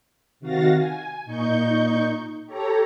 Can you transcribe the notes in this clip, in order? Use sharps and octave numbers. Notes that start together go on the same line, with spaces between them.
C3 D#3 F#4 F5 A6 A#6
G#5
A#2 D#4 C#6 G6
G4 A4 C#5 A#5